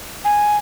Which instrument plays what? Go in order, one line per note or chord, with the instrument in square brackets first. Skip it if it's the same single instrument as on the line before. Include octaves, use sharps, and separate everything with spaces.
[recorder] G#5